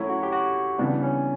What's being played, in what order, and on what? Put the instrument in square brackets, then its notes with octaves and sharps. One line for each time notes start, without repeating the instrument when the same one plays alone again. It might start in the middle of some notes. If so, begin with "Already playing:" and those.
Already playing: [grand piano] F#3 A3 C#4 E4
[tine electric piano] F#4
G4
F#4
[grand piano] C#3 E3 G3 B3 [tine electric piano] D4
[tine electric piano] C#4